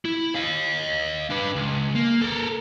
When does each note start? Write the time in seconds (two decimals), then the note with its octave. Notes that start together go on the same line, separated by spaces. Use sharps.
0.05 E4
0.35 D#5 F5
1.30 D4 B4
1.55 C#2
1.94 A#3
2.21 A4 A#4